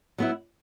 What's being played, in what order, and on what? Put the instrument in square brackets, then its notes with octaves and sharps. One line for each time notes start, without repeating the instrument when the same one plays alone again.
[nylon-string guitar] F#3 B3 E4